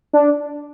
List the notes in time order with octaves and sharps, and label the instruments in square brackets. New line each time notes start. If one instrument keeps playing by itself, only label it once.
[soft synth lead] D4